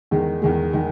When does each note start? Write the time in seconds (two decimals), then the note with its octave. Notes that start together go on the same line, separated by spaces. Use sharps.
0.11 E2 D#3 G#3
0.42 E2 D#3 G#3
0.73 D#3 G#3